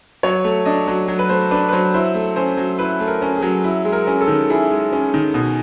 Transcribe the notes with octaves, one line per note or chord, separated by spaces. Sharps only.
F#3 C#5
A3
D4 D#5
F#3
F#3
B4
A3 C5
D4 B4
B4
F#3 C5
E4 C5
A3
C#4 C5
F#3
E4 B4
A3
A#4
C#4
G#4
F#3
E4
G#3
A#4
C#4
A4
D#3
E4 G#4
G#3
C#4
D#3
B2